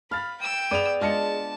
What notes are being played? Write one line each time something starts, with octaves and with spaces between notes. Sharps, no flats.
F5 B5 F6 A6
G5 E6
B3 G#4 B4 D5 D#7 F7
G#3 D4 F4 G#4 D#5 A5 C#7